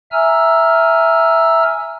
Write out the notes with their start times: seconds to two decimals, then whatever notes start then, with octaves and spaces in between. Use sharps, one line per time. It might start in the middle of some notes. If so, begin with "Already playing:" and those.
0.12 E5 G#5 A#5 E6 F6